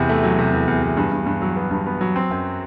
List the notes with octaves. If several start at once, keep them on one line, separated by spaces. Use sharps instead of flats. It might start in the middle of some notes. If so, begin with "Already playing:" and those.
Already playing: E2 C3
A3
F#3
C3
E2
E2
E2
G2
G2
G2
F#3
B3
G2
B3
F#3
C4
F#2